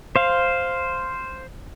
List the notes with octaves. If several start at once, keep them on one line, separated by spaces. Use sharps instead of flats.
C5 F5